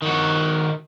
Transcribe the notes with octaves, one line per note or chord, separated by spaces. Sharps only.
D#3 F#4